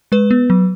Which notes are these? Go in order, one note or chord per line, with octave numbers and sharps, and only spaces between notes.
G#3 B4
B3
F#3